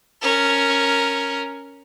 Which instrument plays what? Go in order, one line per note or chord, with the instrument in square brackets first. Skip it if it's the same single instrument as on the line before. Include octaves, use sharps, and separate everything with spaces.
[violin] C#4 A#4